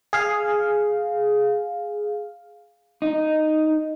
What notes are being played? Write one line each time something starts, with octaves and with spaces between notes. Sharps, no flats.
G#4 F5
D#4